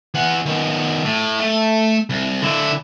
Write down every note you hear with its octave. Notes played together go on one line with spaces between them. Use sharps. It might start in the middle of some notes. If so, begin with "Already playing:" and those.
E3 F#5
D#3 B3
A2
A3
C2
D3 E4